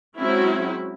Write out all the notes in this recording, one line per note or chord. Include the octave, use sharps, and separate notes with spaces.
F#3 G#3 C4 C#4 E4 F#4